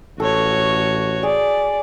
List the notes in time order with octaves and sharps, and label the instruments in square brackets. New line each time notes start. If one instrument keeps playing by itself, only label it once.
[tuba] A1 [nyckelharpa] F#4 C#5 [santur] A4
[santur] G#4 [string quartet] D5